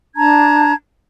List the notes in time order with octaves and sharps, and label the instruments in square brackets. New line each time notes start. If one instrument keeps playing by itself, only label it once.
[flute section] D4 A5 A#5 G#6